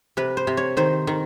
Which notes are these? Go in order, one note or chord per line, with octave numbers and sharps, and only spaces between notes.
C3 B4
C5
C3
C#5
D#3 C5
D#3